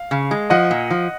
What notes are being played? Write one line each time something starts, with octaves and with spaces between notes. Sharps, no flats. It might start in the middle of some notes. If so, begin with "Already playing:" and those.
Already playing: F5
C#3
G#3
F3 D#5 F#5
A#2
F3